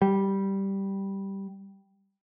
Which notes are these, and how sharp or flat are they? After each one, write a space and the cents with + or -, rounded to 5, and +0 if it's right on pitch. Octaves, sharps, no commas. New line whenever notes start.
G3 -5